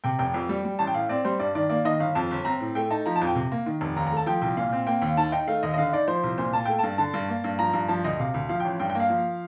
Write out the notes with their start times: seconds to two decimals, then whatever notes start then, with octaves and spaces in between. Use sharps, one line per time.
0.04 C3 G5
0.19 F1 G5
0.34 F2
0.49 G3
0.65 G3
0.79 A1 A5
0.87 G5
0.94 A2 F5
1.09 C4 D5
1.25 G3 C5
1.39 G2 D5
1.55 D#3 D5
1.69 A#3 D5
1.85 D#3 D#5
2.00 G1 F5
2.15 F2 A5
2.31 G1
2.45 C4 A#5
2.60 A2
2.75 A3 G5
2.91 D#4 A5
3.06 F3 A#5
3.16 A5
3.22 F2 G5
3.36 C3
3.52 A#3
3.66 D#3
3.81 F1
3.96 D#2 A#5
4.07 A#5
4.11 A3
4.17 A5
4.26 F3 G5
4.42 C2 G5
4.57 A#2 F5
4.73 C4
4.86 A#3 G5
5.02 D#2
5.17 D#3 A5
5.32 D#4 G5
5.48 A3 F5
5.63 D#2 D#5
5.74 D#5
5.78 D3 F5
5.93 D#4 D5
6.07 F3 C5
6.24 C2
6.38 A#2 C5
6.53 A#3 A5
6.65 A3 G5
6.79 G2 A5
6.98 D3 A5
7.14 G2
7.29 A#3
7.44 G2
7.59 F3 A#5
7.74 G2
7.88 F3 A5
8.04 D2 D#5
8.19 C3 F5
8.34 D2
8.49 F3 F5
8.60 G5
8.65 A1
8.80 G2 G5
8.90 G5
8.95 A#3
9.00 F5
9.10 F3